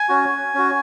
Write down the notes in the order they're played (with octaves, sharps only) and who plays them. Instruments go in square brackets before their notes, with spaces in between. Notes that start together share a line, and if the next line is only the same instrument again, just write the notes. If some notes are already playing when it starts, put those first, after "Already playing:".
Already playing: [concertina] G#5
C#4 F#4
C#4 F#4